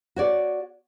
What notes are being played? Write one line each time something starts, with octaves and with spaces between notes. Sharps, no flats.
F#4 C#5 D5